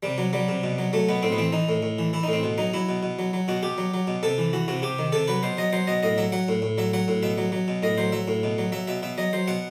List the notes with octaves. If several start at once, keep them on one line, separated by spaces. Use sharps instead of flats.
C3 G3
F#3
F#3 G3
C3
B2
F#3
F#3 A3
B2 B3
A2 C4
B3
E3 C4
E3 D#4
A2
A2
E3
E3 E4
A2 D#4
C4
B2
F#3 D#4
F#3 E4
B2
B2
F#3
F#3
B2 F#4
B2 G4
F#3
F#3
B2
C3 A4
E3
E3 F#4
C3 F#4
C3 G4
D#3
C3 A4
F#3 B4
B2 C5
F#3 D#5
F#3 C5
B2 D#5
A2 D#5
F#3 E5
F#3 F#5
A2
A2
F#3 E5
F#3 F#5
A2
B2 E5
F#3
F#3
B2
A2 D#5
F#3 C5
F#3 E5
A2
B2
F#3
F#3 E5
B2 E5
B2 E5
F#3 D#5
F#3 C5
B2 F#5